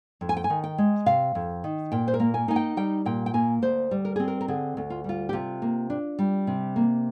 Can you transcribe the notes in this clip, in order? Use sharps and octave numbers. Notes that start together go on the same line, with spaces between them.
F2
G#5
G5
G#5
D#3
G5
G#3
C3 F5
F2
D#3
A#2 G5
C5
A#4
A#3
G#5
D#4 G#5
G5
G3 G5
A#2 G5
G5
A#3 G#5
D2 C5
G3
A#4
C4 G#4
A#4
A#4
D3 G#4
D2
F4
G3 F4
G4
C3 F4
A#3
D4
G3
C3
A#3